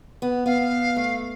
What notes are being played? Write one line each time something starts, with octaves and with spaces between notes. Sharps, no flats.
B3
B3 F5
A3